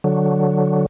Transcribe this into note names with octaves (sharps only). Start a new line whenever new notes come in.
D3 F#3